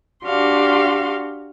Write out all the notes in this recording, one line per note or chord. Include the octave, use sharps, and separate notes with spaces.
D4 F#4 G4 F5 C6